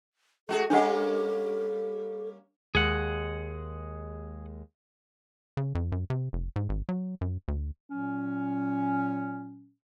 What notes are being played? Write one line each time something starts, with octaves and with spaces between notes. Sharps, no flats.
G#3 F#4 G#4 A4
G3 A#3 C#4 D4 A4 F#5
D#2 G#3 G#4 F#5
C#3
F2
F#2
C3
F1
G#2
G#1
F#3
F#2
D2
A#2 F#3 C#4